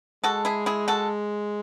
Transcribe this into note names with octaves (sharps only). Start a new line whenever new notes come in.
G#3 F#4 A4
E4 G#4
E4 G#4
F#4 A4